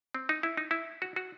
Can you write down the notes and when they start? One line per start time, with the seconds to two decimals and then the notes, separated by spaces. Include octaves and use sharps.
0.14 C4
0.29 D#4
0.43 E4
0.57 D#4
0.71 E4
1.02 F#4
1.16 F#4